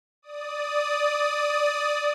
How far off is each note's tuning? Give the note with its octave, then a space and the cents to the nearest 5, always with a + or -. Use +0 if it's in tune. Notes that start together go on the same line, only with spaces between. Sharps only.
D5 +0 D#6 +0